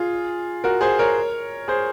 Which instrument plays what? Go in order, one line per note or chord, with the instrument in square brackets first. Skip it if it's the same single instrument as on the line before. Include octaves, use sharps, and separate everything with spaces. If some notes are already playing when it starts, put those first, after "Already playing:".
Already playing: [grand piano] F4 G#4
F#4 A#4
G#4 C5
A#4 C#5
G#4 C5